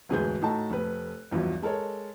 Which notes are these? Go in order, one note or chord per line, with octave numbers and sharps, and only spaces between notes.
E1 D2 G#2 G#4 B4 G6
A2 D#4 F#4 A4 A5 A#5
F1 A3 B4
A#1 E2 G2 F3 F#3
G#3 A4 A#4 C#5